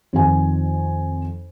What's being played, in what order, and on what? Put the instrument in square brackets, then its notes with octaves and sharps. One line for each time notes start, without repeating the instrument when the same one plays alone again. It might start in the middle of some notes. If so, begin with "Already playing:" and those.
[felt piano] F2 D#3 G#5